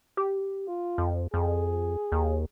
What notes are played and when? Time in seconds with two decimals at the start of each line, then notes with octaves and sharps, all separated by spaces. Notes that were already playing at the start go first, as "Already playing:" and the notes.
0.17 G4
0.68 F4
0.98 F2
1.34 F2 G#4
2.12 D#2